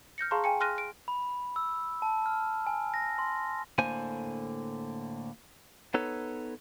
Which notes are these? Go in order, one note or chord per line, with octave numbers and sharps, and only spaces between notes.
F6 G6 A#6 C#7
G#4 F5 A5 A#5 C6 C#6
G5 G#5 C#7
G#4 C6 F6 F#6 A#6 D#7
D7
B5
E6
A5
F6
G#5
A#6
C6
A2 D3 A#3 C5 G#5
B3 D#4 A4 B4 C#5